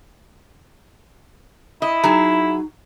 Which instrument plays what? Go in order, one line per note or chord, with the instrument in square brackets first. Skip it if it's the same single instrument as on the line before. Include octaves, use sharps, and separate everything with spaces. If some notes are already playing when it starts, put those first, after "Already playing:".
[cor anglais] E4 [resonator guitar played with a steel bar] D#5
[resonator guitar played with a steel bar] F#3 G#4 [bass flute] D#4